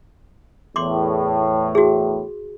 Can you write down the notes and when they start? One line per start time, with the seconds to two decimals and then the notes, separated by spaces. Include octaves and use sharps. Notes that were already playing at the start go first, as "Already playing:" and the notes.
0.76 E2 A2 C6 D6
1.75 F#4 G#4